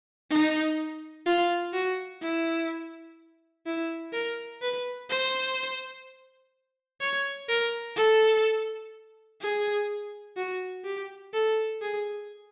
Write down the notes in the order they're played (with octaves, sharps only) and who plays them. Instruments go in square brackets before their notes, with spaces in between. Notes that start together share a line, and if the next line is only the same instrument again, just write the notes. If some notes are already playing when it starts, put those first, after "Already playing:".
[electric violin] D#4
F4
F#4
E4
E4
A#4
B4
C5
C#5
A#4
A4
G#4
F#4
G4
A4
G#4